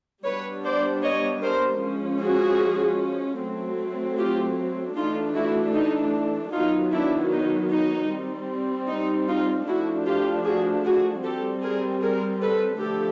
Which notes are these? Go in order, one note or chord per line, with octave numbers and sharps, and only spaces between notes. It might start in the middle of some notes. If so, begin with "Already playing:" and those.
G3 B3 D4 B4 C#5
C5 D5
C#5 D#5
A#4 C5
F3 G#3 C#4
F#4 G#4
F#3 A3 C4
F4 G4
E3 A3 D4 D#4 F4
E4 F#4
D#4
D#3 F#3 B3 D#4 F4
D4 E4
D#4
D#4
G3 C4
D#4
D#4 F4
F3 A3 D4 E4 F#4
F4 G4
F#4 G#4
F#4 G#4
G3 C4 G4 A4
G#4 A#4
G#4 A#4
A4 B4
D3 F3 A3 G4 A4